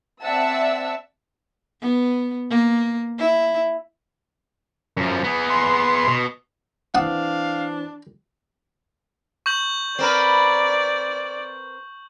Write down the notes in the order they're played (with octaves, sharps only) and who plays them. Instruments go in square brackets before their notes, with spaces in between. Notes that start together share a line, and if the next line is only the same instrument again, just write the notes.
[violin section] C4 D5 E5 F#5 A5 E6
[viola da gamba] B3
A#3
E4
[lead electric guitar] F#2 F3
B3 G#4
[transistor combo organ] C6
[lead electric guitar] B2
[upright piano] E3 C4 [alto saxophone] D4 [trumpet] F5 [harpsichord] F#5 D#6
[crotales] C#6 G6 F#7
[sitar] C4 A#4 B4 [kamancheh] D5